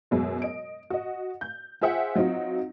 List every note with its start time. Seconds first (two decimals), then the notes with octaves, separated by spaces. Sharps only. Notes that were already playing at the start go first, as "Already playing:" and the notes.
0.11 F#2 B2 G#3
0.42 D#5 D7
0.90 F#4 D#5
1.41 G6
1.81 F4 G#4 C5 E5 F#5 G5
2.15 F#3 C4 D#4 F4 F#4